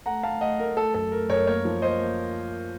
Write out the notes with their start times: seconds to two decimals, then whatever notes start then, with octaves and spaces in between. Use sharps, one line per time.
0.06 A3 F#5 A#5
0.23 A3 F5 A5
0.41 A3 D#5 F#5
0.59 A3 A#4
0.76 A3 A4
0.94 F#2 A4
1.12 A3 A#4
1.29 F#2 A#4 C#5
1.47 A#3 A#4 C#5
1.65 F3
1.82 A#3 C5 D#5
2.00 A#3